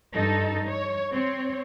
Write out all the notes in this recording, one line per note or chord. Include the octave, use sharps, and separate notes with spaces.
G2 D#4 A4
C#5
C4 C#5